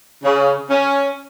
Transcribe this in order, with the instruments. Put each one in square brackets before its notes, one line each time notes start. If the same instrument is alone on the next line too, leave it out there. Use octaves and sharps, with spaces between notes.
[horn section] C#3
C#4